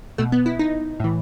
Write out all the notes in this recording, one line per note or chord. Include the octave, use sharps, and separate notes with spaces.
B2 A3
B3
E4
D#4
A2 E3